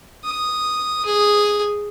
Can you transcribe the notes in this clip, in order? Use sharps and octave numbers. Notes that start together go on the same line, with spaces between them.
D#6
G#4